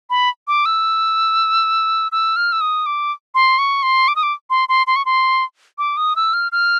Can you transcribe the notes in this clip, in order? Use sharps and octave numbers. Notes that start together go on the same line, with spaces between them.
B5
D6
E6
E6
F6
E6
D#6
D6
C6
C#6
C6
D6
D#6
D6
C6
C6
C6
C#6
C6
D6
D#6
E6
F6
F6